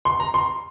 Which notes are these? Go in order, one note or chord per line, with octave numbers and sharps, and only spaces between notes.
C6
A#5
C6